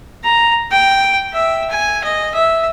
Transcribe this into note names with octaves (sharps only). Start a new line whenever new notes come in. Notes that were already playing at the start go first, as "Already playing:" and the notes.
A#5
G5
E5
G#5
D#5
E5